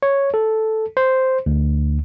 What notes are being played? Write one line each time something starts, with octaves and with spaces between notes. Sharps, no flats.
C#5
A4
C5
D2